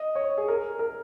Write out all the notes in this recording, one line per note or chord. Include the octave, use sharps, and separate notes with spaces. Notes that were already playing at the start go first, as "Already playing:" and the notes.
Already playing: D#5
C#5
G#4
A#4
A#4